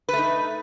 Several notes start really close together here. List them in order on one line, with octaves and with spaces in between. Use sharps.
B4 A3 D#4